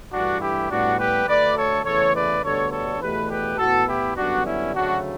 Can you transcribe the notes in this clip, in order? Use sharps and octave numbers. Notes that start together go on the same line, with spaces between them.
G2 E3 A3 D4 F#4
E4 G4
A2 G3 B3 D4 F#4
G4 B4
D2 D3 A3 B4 D5
A4 C#5
E2 C#3 E3 A3 A4 C#5
B4 D5
D2 D3 G3 B3 A4 C#5
A4 C#5
E2 B2 A3 G4 B4
G4 B4
A2 E3 B3 F#4 A4
E4 G4
F#2 D3 G3 B3 D4 F#4
C#4 E4
D2 C#3 F#3 A3 D4 F#4